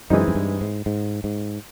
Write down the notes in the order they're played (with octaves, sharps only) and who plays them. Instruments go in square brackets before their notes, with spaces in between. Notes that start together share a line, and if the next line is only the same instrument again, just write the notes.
[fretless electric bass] F#2 [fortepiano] E3 G#3 C4 D#4
[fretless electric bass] F#2
G2
G#2
G#2
G#2